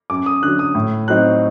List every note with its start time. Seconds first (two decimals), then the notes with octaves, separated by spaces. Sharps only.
0.10 F#2 D6
0.26 D#6
0.42 D3 F#6
0.47 F#3
0.59 D#6
0.75 A2
1.08 F#3 C4 D#4 F#6